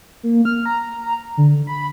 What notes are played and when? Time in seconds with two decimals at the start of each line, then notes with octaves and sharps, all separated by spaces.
0.23 A#3
0.45 F6
0.66 A#5
1.37 D3
1.67 B5